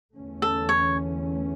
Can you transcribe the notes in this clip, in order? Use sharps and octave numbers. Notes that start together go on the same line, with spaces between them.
E2 D3 A3 C#4
A4
C#5